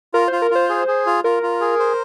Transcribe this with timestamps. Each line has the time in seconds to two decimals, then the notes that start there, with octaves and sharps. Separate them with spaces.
0.14 F4 A#4
0.28 F4 C5
0.42 A#4
0.51 F4 C5
0.69 G#4
0.88 G#4
1.06 F4
1.24 F4 A#4
1.43 F4
1.61 G#4
1.79 C5